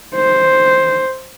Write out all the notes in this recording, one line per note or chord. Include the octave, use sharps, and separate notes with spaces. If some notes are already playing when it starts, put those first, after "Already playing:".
C5